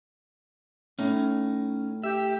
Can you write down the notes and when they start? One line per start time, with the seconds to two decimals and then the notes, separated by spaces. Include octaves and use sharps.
0.99 A2 C#4 D#4
2.04 G4 E5